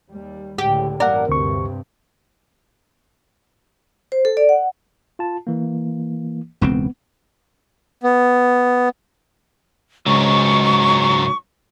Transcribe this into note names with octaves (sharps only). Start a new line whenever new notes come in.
D#2 G3
C#2 A2 D3 G4
A1 G2 A#3 A#4 D5 F#5
D2 G2 C3 C4 C#6
C5
A4
D5
F#5
F4 A5
E3 A#3
E1 C#2 B3 C4
B3
C#2 G#2 F#3 C#6